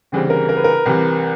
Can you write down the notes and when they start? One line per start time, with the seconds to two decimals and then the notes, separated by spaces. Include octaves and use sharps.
0.12 D2 C#3 E3 G3 C4
0.30 A#4
0.49 A#4
0.57 B4
0.64 A#4
0.86 C2 C3 E3